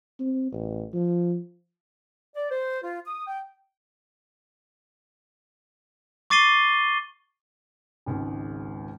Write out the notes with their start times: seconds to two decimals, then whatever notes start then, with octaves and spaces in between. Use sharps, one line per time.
0.20 C4
0.52 A1
0.94 F3
2.36 D5
2.50 C5
2.82 F4
3.06 D#6
3.27 G5
6.30 C#6 D6 A6 C7 D#7 G7
8.06 G#1 C#2 D#3 G#3